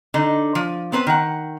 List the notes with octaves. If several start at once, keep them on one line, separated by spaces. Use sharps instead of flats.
D3 D#4
F3
B3 C4 B4 C5
D#3 F#5